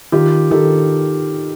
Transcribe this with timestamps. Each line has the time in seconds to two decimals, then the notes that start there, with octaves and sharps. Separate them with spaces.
0.12 D#3 F4 G4
0.51 D#3 G4 A4